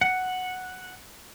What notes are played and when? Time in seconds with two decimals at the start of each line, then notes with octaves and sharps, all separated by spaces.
0.01 F#5